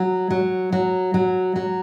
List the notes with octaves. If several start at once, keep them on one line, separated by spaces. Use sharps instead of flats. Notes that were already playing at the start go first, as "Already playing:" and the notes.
Already playing: F#3
F#3
F#3
F#3
F#3